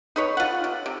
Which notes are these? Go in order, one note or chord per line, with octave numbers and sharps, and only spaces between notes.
D#4 B4 C#5
F4 F#5
C3
C3